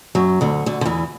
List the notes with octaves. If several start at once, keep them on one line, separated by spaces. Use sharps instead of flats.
F#2 F#3
D2 D3
D2 D3
D3
E2 E3